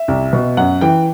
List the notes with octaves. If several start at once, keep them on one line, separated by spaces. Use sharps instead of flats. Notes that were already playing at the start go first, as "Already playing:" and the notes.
Already playing: E5
C2
B2
F#2 F#5
E3 G5